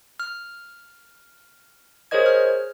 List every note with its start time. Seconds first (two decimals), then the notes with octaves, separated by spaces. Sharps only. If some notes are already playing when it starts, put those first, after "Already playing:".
0.20 F6
2.11 G#4 A#4 C5 C#5 D#5 G#6
2.26 F6